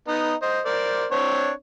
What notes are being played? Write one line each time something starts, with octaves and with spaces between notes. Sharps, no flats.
B3 D#4
C5 D#5
A#4 C5 D5
C4 D4 C#5